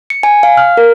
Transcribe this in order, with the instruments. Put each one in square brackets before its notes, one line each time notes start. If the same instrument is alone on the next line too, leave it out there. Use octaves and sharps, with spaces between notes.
[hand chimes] C#7
G#5
F5
F6
A#4